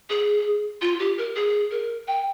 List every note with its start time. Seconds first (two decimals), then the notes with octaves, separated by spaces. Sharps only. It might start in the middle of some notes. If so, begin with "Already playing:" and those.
0.10 G#4
0.81 F4
0.99 G4
1.18 A#4
1.35 G#4
1.71 A#4
2.08 G5